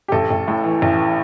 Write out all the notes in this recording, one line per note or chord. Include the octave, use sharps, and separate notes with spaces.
G4
A1 A4
A1
A2
E3
A1